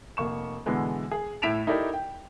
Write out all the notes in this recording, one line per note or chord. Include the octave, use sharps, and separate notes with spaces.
F1 A#3 C#6 E7
B2 D3 E3 G#3 B3
G#4
A2 E4 B6 D7 E7 F7
D#4 E4 G4 A4 A#4 D5
G5